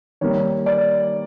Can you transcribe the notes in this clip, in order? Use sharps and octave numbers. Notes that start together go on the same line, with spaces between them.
D#3 G3 A#3 C#5
D5